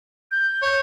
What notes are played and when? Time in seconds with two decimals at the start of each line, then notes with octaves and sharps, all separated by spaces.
0.32 G6
0.62 C#5